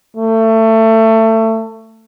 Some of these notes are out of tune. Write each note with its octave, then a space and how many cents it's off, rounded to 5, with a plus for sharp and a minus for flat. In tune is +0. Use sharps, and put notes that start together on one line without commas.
A3 +25